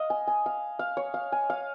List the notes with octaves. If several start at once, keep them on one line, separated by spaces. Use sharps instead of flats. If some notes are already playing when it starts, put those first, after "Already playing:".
Already playing: D#5 F5
G#5
G#5
F5
F5
C#5
F5
G#5
F5